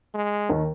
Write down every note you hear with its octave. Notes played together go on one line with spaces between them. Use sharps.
G#3
D#2 D#3